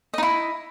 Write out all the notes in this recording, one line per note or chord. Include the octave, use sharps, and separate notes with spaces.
D#4 E4 D#5